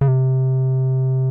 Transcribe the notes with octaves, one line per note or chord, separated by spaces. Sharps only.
C#3
C3